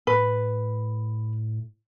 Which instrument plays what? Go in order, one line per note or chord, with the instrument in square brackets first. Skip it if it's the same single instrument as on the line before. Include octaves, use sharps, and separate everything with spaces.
[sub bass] A2 [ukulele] B4